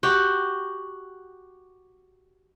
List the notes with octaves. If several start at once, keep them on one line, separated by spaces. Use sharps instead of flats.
F#4 G4